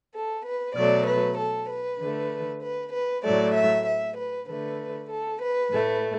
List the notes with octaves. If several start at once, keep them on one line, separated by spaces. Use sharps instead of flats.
A4
B4
B2 F#3 A3 D5
B4
A4
B4
D3 A3
B4
B4
A2 F#3 A3 D5
E5
E5
B4
D3 A3 B4
A4
B4
A2 A3